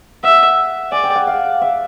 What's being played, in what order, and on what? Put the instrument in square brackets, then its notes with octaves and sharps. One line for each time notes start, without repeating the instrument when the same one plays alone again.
[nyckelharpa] E5 [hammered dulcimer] F#5
[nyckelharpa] D5 [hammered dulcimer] G#5
[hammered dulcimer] G5
F#5
F5
E5